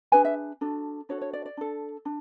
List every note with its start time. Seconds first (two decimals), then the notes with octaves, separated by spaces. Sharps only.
0.12 D4 G#4 B4 G#5
0.25 E5
0.61 D4 F#4 A4
1.09 D4 F#4 A4 C#5
1.21 C#5
1.33 D5
1.46 D5
1.57 D4 A4
2.05 D4